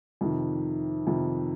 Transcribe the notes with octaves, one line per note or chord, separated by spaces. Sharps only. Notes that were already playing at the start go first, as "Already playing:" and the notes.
F2 C3 D#3
F2 C3 D#3